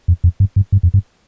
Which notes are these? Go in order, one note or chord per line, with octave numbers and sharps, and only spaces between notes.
F2
F2
G2
G2
G2
F2
G2